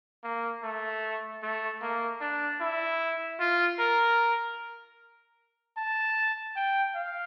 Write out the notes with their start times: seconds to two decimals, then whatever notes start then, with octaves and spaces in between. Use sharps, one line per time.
0.24 A#3
0.63 A3
1.42 A3
1.82 A#3
2.21 D4
2.61 E4
3.40 F4
3.79 A#4
5.77 A5
6.56 G5
6.95 F5